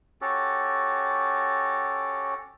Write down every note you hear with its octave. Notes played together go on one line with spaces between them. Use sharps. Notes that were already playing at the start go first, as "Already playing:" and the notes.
C#4 F#4 G4 A4